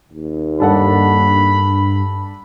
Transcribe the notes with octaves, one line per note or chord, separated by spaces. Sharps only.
D#2
G2 D4 A4 F#5 B5